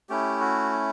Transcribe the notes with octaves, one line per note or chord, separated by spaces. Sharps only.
A3 C#4 E4 G4
F#4